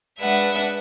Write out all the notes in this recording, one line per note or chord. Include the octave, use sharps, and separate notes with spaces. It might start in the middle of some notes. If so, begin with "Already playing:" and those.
G#3 D4 B4 E5 F#5